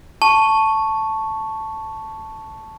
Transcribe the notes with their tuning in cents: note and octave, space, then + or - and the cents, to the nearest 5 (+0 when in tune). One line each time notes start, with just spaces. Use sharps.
A5 +0 C#6 +0